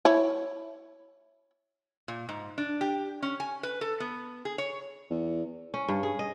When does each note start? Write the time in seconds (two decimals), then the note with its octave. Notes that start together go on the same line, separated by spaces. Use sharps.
0.05 E4 C#5
2.08 A#2
2.29 G#2
2.58 D4
2.81 G4
3.22 C#4
3.40 G#5
3.63 B4
3.81 A4
4.00 B3
4.45 G#4
4.58 C#5
5.10 E2
5.74 C#4
5.88 G2
6.03 G#4
6.19 D#5